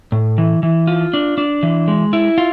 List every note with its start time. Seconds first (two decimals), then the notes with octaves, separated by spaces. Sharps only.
0.12 A2
0.38 E3
0.63 E3
0.87 F4
1.13 D4
1.38 D4
1.63 E3
1.88 G#3
2.13 E4
2.38 F4